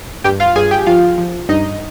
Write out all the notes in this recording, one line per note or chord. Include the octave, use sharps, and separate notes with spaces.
G2 G4 G5
F4 F5
G2 G#4 G#5
G4 G5
F3 F4 F5
F3
G2 D#4 D#5